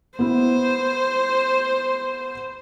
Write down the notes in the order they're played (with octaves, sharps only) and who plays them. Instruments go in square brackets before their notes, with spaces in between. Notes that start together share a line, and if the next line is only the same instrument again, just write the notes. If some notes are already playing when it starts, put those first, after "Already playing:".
[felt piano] B3 E4 [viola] C5